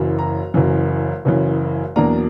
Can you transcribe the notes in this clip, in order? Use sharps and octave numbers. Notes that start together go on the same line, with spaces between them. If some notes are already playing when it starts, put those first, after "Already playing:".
Already playing: F#1 F#2 C#3 E3
A#5
F#1 F#2 C#3 E3
F#1 F#2 C#3 E3
E2 B2 F#3 A#3 D4 A#5